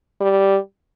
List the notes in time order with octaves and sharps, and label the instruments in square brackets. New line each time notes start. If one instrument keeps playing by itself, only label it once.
[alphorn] G3